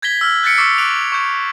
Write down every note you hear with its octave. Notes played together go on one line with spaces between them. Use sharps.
G6 G#6 A#6 B6 G7
E6 F6
F#6 G6 A6 B6 C#7 D7
C#6 D6 E6 A6 C7
D6 E6 F#6 D7 F7
C#6 G6 C#7